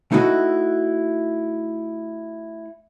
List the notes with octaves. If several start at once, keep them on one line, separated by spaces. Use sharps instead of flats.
A3 D#4 E4 F#4 D#5